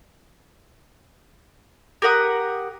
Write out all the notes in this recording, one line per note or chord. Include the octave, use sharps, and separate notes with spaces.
G4 A#4 F#5 D#6